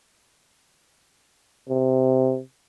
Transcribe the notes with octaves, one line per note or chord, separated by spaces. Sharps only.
C3